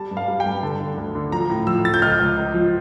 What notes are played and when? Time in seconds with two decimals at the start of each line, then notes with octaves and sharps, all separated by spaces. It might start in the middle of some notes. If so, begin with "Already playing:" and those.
Already playing: G3 A5
0.11 G2
0.17 F5
0.28 G3
0.40 G5
0.46 G2
0.63 D3 A5
0.80 D3
0.98 D2
1.15 D3
1.32 F3 A#5
1.49 A2
1.67 F3 E6
1.85 F3 A6
1.94 G6
2.02 C#2 F6
2.20 C#2
2.37 C#2
2.54 F3